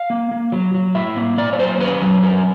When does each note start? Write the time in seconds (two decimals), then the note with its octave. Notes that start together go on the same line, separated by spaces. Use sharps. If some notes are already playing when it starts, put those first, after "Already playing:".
Already playing: F5
0.10 A#3
0.31 A#3
0.52 F#3
0.74 F#3
0.95 A2 E5
1.17 A#3
1.38 A#3 D5
1.53 C#5
1.59 F#3 C5
1.80 C#4 B4
2.02 F#3
2.23 C#4 A#4